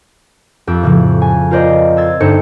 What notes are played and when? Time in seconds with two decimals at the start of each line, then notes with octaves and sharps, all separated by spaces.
0.67 F2 G4 E6
0.83 A2 C#3 F3
1.22 G#5
1.51 F4 A#4 C5 D5 D#5
1.97 C6 E6 G#6 A6
2.20 G1 G2 D#4 A4 C5 C#7